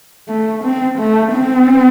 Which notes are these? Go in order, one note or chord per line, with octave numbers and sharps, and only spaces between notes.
A3
C4
A3
C4